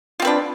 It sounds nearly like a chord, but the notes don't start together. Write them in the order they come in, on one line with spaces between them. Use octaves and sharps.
F4 C4 B4 D4